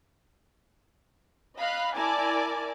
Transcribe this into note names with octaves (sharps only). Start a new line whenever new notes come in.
D#5 F5 B5 F#6
E4 A#4 D5 G#5 A5 D6